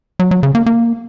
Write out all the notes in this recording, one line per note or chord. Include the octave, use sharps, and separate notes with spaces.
F#3
F#3
C#3
A#3
A#3